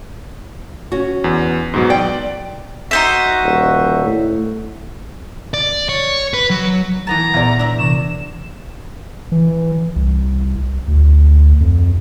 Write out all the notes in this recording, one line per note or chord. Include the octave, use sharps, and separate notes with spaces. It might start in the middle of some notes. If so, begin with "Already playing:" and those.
C#4 F#4
E2
G#2 B2 F#3
D5 G5
D#4 F#4 C5 E5
D#1
A2
D5
C#5
B4
F#3
E3 B3 A5 A#5
E2 A#2 D5
D4 E5
C3 E3 C#6 E7
E3
C2
D2
F2